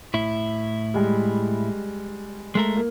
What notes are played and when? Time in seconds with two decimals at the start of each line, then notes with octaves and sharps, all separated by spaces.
0.14 A2 E4
0.94 G3 G#3
2.55 G#3 A3 A#4
2.76 A#3